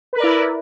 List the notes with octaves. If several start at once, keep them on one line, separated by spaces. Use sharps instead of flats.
E4 A#4 B4 D5